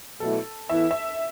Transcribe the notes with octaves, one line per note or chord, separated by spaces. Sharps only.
B2 F#3 A3 E4 A4
E3 B3 E4 A4 E5
E5